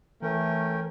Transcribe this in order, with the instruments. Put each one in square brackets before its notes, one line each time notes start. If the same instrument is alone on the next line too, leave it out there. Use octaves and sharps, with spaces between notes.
[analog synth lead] E3 [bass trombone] A3 [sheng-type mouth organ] C#4 A#4 G5